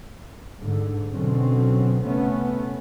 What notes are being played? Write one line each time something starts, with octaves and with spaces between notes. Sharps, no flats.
G#2 D3
B2 D3 F#3 C4 C#4
C3 A3 B3 C#4